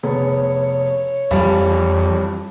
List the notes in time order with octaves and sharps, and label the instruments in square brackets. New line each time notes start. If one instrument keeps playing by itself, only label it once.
[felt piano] F1 B3 G#4 [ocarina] C#5
[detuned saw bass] F2 [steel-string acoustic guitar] E3 G3 [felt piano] F5 A5 B5